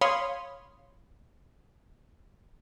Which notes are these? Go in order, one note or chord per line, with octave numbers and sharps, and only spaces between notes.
C#5 F5 B5 C6 D#6